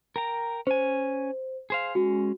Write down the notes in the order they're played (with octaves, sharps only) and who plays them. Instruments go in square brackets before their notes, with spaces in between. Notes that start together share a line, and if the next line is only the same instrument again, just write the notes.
[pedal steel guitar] A#4 G5 A#5
[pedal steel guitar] C#4 G#5 [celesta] C5
[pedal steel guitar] G#4 C5 F5
[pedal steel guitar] G#3 C#4 [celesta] F#4